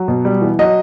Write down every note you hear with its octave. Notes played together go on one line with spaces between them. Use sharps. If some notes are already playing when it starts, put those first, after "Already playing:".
Already playing: F#3
B2
G3
E3
F#3 D#5